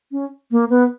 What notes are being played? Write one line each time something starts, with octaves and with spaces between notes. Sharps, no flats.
C#4
A#3
B3